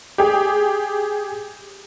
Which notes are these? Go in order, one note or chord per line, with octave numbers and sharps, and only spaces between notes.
G4 G#4